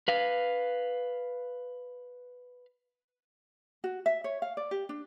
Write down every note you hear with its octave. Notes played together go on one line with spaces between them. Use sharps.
B4 F5
F#4
E5
C#5
F5
D5
G4
D4